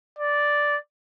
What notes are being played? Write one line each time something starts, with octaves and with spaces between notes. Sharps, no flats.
D5